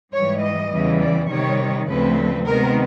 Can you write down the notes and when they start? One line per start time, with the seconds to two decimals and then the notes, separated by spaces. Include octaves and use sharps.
0.13 G#2 E3 G3 C#5
0.42 D#5
0.71 E2 C#3 E3 G3
1.01 D5
1.30 C3 D#3 G3 C#5
1.88 D2 C#3 F3 A3 C4 B4
2.46 C3 D#3 G#3 B3 A#4